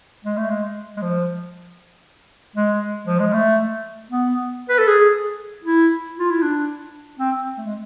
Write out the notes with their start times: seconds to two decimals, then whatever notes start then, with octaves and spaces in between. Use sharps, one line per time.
0.25 G#3
0.37 A3
0.50 G#3
0.97 G#3
1.02 F3
2.56 G#3
3.07 F3
3.20 G#3
3.33 A3
4.11 B3
4.69 B4
4.78 A4
4.87 G#4
5.64 E4
6.19 F4
6.31 E4
6.42 D4
7.20 C4
7.58 A3
7.66 G#3